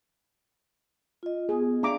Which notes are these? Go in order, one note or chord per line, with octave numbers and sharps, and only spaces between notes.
F4 D#5
B3 G#4
D4 F5 A#5 D6